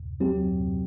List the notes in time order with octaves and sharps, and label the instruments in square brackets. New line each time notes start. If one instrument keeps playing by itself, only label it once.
[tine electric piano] F#3 C4 G4